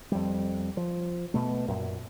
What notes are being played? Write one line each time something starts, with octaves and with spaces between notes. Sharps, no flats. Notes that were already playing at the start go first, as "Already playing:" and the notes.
F2 G3
F3
B2 A3
F#2 A#2